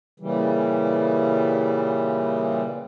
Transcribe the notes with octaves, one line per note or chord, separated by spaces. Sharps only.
A#2 C#3 E3 G3